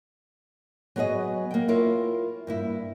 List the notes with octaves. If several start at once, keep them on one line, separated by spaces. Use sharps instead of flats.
F#3 B3 G#4 C#5 D#5
A#3 G5
E4 F4 A#4 C#5
G2 A#3 E4